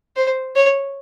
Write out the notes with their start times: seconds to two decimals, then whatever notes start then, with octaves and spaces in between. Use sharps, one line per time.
0.16 C5
0.56 C#5